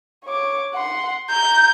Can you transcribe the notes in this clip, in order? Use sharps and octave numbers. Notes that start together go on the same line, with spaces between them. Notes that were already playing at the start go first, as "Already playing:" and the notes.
C#5 D6
F#5 C6
A#5 G6